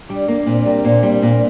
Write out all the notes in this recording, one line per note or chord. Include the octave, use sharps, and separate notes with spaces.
G3 D4 D5
A#3 D4 D5
A#2 C4 C5
G3 A#3 A#4
D5
A#2 C4 C5
G3
A#2